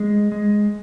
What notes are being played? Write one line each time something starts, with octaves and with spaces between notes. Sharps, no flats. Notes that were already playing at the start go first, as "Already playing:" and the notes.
Already playing: G#3 G#4
G#3